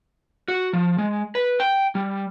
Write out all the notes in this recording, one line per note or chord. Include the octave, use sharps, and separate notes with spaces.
F#4
F3
G#3
B4
G5
G3